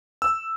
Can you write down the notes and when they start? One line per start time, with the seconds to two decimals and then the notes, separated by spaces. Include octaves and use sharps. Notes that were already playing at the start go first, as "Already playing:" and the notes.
0.22 E6